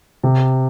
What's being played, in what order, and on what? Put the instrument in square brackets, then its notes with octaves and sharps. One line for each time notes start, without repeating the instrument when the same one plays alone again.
[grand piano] C3